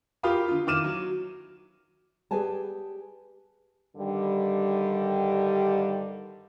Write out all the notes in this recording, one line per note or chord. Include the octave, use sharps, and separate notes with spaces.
F4 G4 A#4 F5 B5 D#6
D3 F4
D#3 E4 D6 F6 D#7 E7
F#3
G4 G#4 B4 D5 G#5 A5
G2 D3 D#3 G3